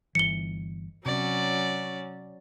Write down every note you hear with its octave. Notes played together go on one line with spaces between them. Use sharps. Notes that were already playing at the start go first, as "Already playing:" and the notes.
G1 E3 C#7 G7
C3 F#3 C#4 D5